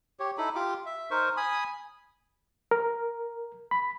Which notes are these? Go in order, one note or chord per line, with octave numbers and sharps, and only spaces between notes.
G4 C#5
D#4 E4 A4 B5
F4 G4 D6
E5
D#4 A#4 C5 C#6
G#5 B5 D#6
A#4
B5